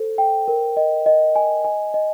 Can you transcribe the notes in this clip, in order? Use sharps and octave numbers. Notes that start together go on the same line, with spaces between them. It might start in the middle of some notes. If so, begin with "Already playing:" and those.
Already playing: A4 C5
G5
A#4
D#5
D#5
G#5
G#5
D#5